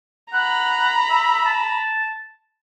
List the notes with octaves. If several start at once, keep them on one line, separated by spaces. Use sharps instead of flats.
F#5 A#5 B5
E5
A5